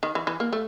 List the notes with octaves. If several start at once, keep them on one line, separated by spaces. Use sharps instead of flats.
D#3
E3
E3
A#3
A3